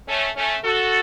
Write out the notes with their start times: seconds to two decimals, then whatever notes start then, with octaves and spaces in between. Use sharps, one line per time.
0.08 A3 C#4
0.36 A3 C#4
0.64 F#4 A4